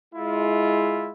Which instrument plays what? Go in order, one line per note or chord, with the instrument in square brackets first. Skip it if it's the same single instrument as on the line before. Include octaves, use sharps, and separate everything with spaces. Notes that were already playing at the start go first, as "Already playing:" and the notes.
[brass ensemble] G#3 E4 F4